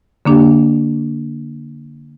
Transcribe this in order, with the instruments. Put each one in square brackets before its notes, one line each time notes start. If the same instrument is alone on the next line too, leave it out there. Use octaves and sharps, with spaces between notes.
[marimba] D3 A#3 D4 G4